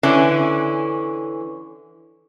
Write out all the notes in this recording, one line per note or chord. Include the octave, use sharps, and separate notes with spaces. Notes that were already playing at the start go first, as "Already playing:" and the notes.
D3 E3 C#4 D5